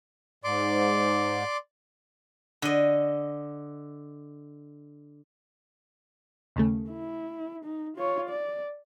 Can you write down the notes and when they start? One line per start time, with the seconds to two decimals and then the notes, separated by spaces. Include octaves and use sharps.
0.44 G#2 D5 C6 D6
2.62 D3 D#5
6.56 D#2 C#3 A3
6.90 E4
7.64 D#4
7.96 F4 C#5
8.29 D5